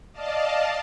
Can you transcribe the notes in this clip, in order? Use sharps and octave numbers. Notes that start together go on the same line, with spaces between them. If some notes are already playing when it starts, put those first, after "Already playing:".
D5 D#5 F5 A5